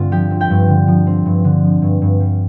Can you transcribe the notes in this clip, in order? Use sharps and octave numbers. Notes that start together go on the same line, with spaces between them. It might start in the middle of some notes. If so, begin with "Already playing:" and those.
Already playing: G2 D3 C4 F4
F3 G4
C4
G4 G5
G2
D3
F3
C4
G2
D3
F3
G2
G2
G3